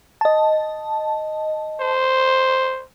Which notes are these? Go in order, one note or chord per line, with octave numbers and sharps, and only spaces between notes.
D#5 A5
C5